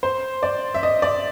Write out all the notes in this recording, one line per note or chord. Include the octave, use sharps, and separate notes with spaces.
C5
D5
E5
D#5
D5